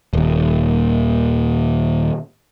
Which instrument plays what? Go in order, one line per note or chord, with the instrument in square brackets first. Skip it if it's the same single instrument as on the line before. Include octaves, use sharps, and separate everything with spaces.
[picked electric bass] D#1 D#2